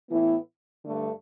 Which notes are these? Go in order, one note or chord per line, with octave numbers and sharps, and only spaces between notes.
A2 E3 B3 E4
G2 D3 A3